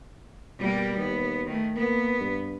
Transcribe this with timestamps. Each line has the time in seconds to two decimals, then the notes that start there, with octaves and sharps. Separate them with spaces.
0.59 B2 G3 A#3
0.96 D#2 B3
1.46 D#3 A3
1.76 A#3 B3
2.20 G2